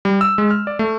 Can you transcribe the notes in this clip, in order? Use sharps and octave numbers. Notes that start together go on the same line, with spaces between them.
G3
E6
G#3
F6
D5
A3